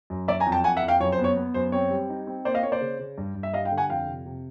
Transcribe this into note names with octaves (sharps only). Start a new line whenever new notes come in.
F#2
F#3 D5 E5
G#5 A#5
F2
G5 A5
F2 F#5 G#5
E5 F#5
F2
F5 G5
F#2 C#5
C5
B3
C#5
B3
F#2 C5
C4 C#5
G3
D#4
C4
A#3 C5 D5
D#5 F5
A#3 C#5
C5 D5
C#3
C#3
G2
G2
E5
G3 D#5 F5
F5 G5
D3
F#5 G#5
F2 F5 G5
C3
C3